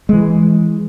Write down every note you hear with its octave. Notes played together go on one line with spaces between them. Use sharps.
E3 G#3